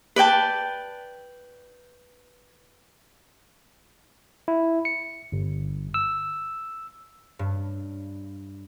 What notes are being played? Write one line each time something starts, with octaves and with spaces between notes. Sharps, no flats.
B4 D5 G5 A5
E4
C#7
G1
E6
G2